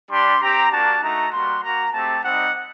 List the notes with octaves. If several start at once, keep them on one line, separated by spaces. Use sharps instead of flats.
G3 D4 G4 C6
C4 G4 A#5
A#3 D4 F#4 A5
A3 D#4 F#4 A#5
G3 A#3 F#4 C6
A#3 F#4 A#5
A3 C4 G4 A5
G3 C4 D#4 F#5